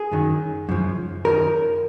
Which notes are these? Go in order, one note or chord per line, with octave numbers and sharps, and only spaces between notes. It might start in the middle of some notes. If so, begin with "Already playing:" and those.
Already playing: G#4
F#2 D#3 F#3
F#2 C#3 F3
F#2 D#3 F#3 A#4